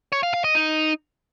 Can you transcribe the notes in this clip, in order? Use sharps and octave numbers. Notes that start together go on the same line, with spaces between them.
C#5
F5
F5
D#5
D#4